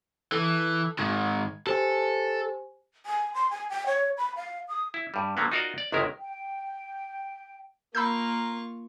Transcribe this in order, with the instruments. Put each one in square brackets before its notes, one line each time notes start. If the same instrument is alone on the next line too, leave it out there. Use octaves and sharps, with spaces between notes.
[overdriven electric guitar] E3 [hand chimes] A4
[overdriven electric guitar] G#2 D#3 [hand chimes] G#6
[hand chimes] G4 C5 G#5 [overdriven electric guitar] A4
[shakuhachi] G#5
C6
G#5
G5
C#5
B5
F5
D#6
[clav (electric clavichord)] E4
G2 G3
D3 F#3 A#3 B3
D#4 F4 F#4 A#4 D5 D#5
D5
G1 C#2 D#3 G#3 E4 A#4
[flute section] G5
[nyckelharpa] A#3 [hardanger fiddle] F4 C#6 [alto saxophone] A#4 [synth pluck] B5 E6 G6